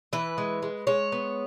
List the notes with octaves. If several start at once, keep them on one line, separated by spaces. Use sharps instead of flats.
E3 B4
G#3
G#3
G#3 C#5
B3